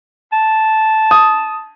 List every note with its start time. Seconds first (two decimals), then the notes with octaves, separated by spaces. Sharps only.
0.33 A5
1.11 D#6